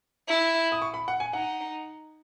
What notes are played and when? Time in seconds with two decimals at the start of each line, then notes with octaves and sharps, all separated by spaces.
0.28 E4
0.72 D#6
0.82 C#6
0.94 B5
1.08 F#5
1.20 G#5
1.33 D#4 F#5